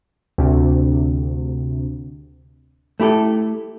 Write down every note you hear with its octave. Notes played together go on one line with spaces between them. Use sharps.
D2 C3
A3 E4 G4 A4